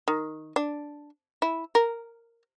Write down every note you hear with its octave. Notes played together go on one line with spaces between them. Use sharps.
D#3
D4
E4
A#4